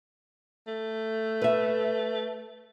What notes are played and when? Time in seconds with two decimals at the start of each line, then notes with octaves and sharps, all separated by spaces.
0.68 A3
1.42 B4 E5